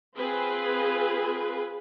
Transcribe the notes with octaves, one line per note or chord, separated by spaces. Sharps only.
C4 F4 G#4 B4